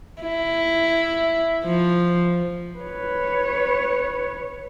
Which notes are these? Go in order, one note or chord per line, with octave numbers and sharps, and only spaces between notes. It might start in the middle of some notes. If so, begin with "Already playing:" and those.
E4
F3
B4 C#5